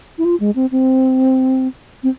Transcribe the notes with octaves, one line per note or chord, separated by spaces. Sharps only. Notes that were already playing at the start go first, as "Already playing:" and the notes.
E4
F4
G#3
C4
C4
C4